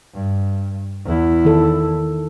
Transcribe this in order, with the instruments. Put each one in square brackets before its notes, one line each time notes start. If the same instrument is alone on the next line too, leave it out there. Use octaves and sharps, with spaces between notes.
[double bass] G2
E2 E4
[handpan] D#3 A4